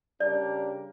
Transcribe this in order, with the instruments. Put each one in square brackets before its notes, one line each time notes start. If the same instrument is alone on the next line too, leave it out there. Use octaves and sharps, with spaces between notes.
[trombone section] C#3 G3 D4 G4 A#4 [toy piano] D5